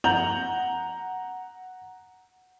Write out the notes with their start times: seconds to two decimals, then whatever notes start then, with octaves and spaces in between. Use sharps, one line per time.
0.04 F#5 A#5 G6 F7 F#7